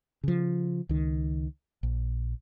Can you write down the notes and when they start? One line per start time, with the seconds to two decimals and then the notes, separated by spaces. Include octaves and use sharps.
0.24 C#3 F3
0.89 C#2 D#3
1.83 A#1